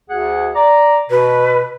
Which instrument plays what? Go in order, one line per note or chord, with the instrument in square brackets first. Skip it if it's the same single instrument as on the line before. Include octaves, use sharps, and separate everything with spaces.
[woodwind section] D2 G#4 F#5
D5 A#5
[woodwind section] B2 [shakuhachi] B4